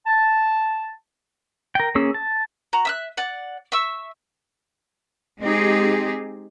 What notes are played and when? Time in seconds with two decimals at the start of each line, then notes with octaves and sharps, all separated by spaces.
0.06 A5
1.75 A#4 G5
1.95 A#3 C#4 G#4 E6
2.14 A5
2.73 F#4 A#5
2.85 E5 E6 F#6
3.17 D5 F#5
3.72 E5 C#6 E6
5.40 G#3 C4 D#4 G4 G#4